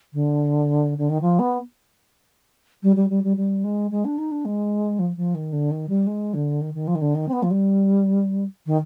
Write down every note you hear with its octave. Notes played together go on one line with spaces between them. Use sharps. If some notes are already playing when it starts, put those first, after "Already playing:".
D3
D3
D#3
F3
B3
G3
G3
G3
G3
G3
G#3
G#3
D4
D#4
D4
G#3
F3
F3
D#3
D3
D#3
G3
G#3
D3
D#3
D#3
F3
D#3
D3
D#3
C4
B3
F3
G3
D#3